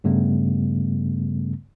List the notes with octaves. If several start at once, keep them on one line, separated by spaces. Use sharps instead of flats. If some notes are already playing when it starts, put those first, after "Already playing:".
G2 C#3 G3 A3 B3